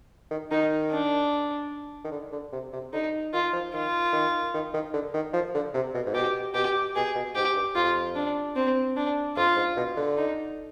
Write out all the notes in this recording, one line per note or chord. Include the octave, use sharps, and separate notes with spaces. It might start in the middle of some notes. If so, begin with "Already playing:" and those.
D#3
D#3 D#4
D4
D#3
D3
D3
C3
C3
D3 D#4
D#3 F4
F3
D#3 F4
D#3
D#3
D#3
D3
D#3
F3
D3
C3
B2
G#2
B2 G4
B2 G4
B2 G#4
B2
G#2 G4
G2
F2 F4
D4
C4
D4
F2 F4
G#2
B2
D3
D#4